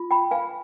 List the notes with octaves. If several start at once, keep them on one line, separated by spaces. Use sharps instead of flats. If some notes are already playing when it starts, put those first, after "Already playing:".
Already playing: F4
G5 B5
B4 F5 G#5